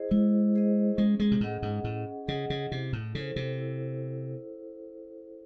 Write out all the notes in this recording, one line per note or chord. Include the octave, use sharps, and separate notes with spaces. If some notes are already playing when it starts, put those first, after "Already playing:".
Already playing: E4 G#4 C5 D#5
G#3 E4
G#4 C5 D#5
G#3 C#4
G#3
C3
A2 G#4 D#5 F#5
G#2
A2 C#4
C#3 G#4 D#5 F#5
C#3
C3 E4
A2
C#3 A4 C5
C3
E4